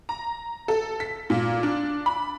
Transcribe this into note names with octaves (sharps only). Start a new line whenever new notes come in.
A#5
A4
B6
A#2
D4
B5